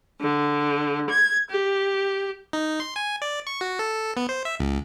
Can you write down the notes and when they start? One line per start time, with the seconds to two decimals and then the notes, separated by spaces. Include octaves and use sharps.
0.20 D3
1.09 G#6
1.49 G4
2.53 D#4
2.80 C6
2.96 G#5
3.22 D5
3.47 C#6
3.61 F#4
3.79 A4
4.17 B3
4.29 C5
4.45 E5
4.60 C#2